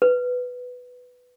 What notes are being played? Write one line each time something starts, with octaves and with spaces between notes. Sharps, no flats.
B4